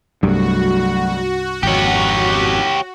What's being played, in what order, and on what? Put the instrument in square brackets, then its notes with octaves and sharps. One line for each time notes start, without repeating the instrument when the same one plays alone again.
[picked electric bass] C2 G2 [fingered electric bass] F#3 A3 [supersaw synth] F#4
[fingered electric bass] G#1 F2 [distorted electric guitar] G4 C#5